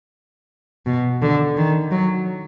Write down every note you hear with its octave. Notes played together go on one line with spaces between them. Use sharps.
B2
D3
D#3
F#3